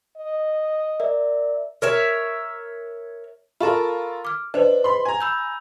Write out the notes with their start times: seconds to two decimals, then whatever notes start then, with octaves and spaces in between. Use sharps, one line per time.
0.17 D#5
1.00 A#4 D5 E5
1.82 A#4 C#5 E5
3.60 F4 A4 A#4 B5 C#6 E7
4.25 D6 F6
4.54 D4 B4 C5 D#5
4.84 B5 C6
5.05 G#5 A#5
5.20 B5 E6 G6